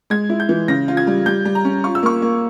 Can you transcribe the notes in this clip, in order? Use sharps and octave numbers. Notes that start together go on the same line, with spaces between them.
G#3 G#6
E4
G6
E3
C#3 A#6
F4
G#6
G3
G3 G6
G3
A#5
C#4
F4 C#6
E6
A#3 C#6
A#3